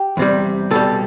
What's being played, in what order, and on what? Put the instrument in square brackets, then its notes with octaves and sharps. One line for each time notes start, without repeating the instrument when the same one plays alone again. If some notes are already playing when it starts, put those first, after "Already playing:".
Already playing: [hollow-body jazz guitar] G4
E2 C3 G3
C2 B2 G3 A4